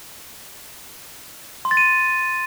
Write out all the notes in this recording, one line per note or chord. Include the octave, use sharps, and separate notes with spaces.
C6
A6
D#7